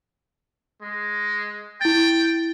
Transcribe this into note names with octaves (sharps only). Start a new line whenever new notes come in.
G#3
E4 G5 A6